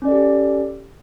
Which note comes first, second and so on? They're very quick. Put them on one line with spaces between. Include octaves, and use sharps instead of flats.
C#4 D5 A4 G4